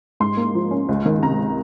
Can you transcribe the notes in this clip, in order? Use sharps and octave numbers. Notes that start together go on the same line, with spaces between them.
G#2 C6
A#3
F3
C#4
C#2
D#3
C3 A#5